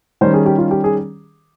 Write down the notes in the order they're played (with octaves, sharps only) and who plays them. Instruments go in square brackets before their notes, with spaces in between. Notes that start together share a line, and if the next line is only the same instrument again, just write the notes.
[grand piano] D#3 G3 C#4 C5
G#4
G4
F4
G4
G#4